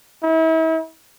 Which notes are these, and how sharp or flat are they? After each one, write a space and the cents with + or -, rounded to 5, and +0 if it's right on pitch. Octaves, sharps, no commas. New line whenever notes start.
E4 -40